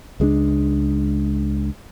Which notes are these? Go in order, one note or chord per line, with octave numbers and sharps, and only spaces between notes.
C#2 G#3 C#4 D4